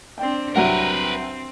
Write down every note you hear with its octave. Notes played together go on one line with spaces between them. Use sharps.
C4 D4 G5
C2 F#3 C4 A#4 B4 F#5